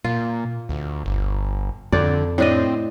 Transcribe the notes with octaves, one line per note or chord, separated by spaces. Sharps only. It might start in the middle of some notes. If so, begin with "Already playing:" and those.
A#2 F4
D2
G1
F2 D3 D5
A2 C4 D4 D#5